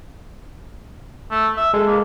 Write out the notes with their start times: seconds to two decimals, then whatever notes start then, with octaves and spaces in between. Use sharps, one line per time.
1.31 A3
1.57 E5
1.74 G#3 A4
1.87 A#3